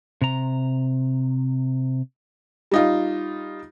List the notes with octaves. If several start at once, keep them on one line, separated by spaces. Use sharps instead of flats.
C3 A#5
G3 D#4 F4